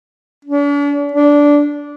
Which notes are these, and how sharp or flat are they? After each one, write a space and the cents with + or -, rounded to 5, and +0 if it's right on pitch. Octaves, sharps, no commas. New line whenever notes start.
D4 -45
D4 -15